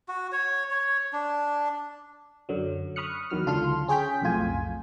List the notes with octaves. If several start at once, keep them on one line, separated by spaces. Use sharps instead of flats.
F#4
C#5
C#5
D4
F#2 D3 F#3
B5 C#6 D#6 F6 F#6 C#7
E2 D#3 F#3 F6
C#2 D3 F4 A5 C6 F6
C#4 G#4 C#5 G5 G6 B6
B1 F2 A2 F3 F4 G#5